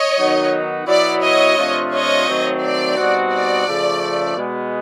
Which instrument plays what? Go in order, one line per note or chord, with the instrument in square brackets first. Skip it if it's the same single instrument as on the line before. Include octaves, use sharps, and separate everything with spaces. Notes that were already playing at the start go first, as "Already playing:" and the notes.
Already playing: [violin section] C#5 D#5
[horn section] D#3 F#3 B3 D#4 F#4
[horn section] B2 F#3 B3 E4 [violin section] D5
[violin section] C#5 D#5
[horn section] C3 F3 A3 D4 F4
[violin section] C#5 D#5
[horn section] D#3 F#3 A3 C4
[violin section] D5
[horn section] B2 G3 C4 D#4 F#4
[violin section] D5
[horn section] C#3 F3 A3
B2 G#3 B3